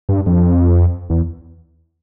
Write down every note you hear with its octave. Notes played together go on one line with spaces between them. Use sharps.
G2
F2
E2